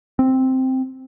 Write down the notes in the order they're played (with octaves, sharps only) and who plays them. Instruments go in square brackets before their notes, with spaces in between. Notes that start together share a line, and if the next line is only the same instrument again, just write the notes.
[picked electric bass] C4